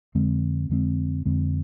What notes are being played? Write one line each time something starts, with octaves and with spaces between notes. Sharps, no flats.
F2 D3 G#3 C4
F2 D3 G#3 C4
F2 D3 G#3 C4